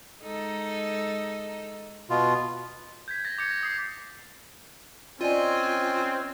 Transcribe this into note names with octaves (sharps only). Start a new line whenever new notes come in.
G#3 D#4 A4
B2 F4
G6 G#6 B6
G6 A6 A#6
D6 G6 G#6 C#7
A#6
D#6 G#6 C7
C4 C#4 F4 D5 D#5 G#5 D#7